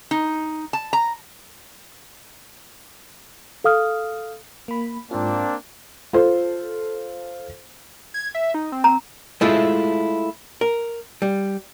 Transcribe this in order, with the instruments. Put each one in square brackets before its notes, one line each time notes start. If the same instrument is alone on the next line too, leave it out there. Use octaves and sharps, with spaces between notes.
[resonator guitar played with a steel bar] D#4
A5
A#5
[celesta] A4 F5 D#6 F6
[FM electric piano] A#3 B5
[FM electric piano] G#2 F4 [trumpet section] A#3 C4 D4
[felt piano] F4 A4 C5
[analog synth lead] G#6
E5
D#4
C4
[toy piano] A#5
[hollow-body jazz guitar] G#3 A3 E4 F4
A#4
G3